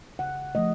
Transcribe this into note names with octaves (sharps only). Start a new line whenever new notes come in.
C#3 F#5
F3 A3 D#5